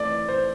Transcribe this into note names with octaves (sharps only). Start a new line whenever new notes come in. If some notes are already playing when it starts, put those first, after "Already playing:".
Already playing: E3 A3 C4 D5
C5